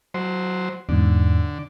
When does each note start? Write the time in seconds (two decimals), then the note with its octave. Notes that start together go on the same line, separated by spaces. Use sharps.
0.14 F#3 C5
0.89 E2 G#2 D3